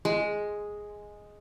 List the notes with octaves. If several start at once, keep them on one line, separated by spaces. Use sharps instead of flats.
G#3